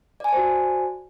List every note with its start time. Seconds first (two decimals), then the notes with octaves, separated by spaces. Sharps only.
0.20 D5
0.24 G#5
0.28 A5
0.33 C5
0.37 F#4